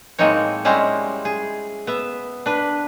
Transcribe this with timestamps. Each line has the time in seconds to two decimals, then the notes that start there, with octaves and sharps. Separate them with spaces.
0.19 A2 G#3 A#3 C4 D#4 C#5
0.65 G3 G#3 C#4 E4 C5 A#5
1.25 G#4
1.87 B3 E5
2.46 D4 B4